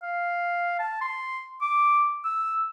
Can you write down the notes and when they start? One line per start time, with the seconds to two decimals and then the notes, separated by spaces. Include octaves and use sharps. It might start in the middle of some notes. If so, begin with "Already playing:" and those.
0.02 F5
0.79 A5
1.01 C6
1.62 D6
2.24 E6